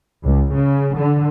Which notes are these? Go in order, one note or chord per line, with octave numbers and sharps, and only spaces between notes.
C#2
C#3
D3